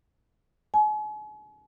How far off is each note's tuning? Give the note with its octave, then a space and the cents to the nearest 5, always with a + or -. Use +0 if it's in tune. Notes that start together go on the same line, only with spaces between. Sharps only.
G#5 +40